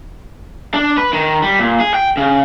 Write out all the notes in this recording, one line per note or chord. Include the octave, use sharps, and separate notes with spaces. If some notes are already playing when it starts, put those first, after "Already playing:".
D4
B4
D#3
G3
A#2
G#4
G5
C#3